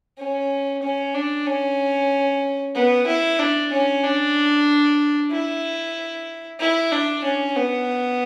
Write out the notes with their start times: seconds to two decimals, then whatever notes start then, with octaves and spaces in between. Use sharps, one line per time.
0.19 C#4
0.83 C#4
1.14 D4
1.47 C#4
2.75 B3
3.07 E4
3.39 D4
3.72 C#4
4.03 D4
5.31 E4
6.60 E4
6.91 D4
7.24 C#4
7.56 B3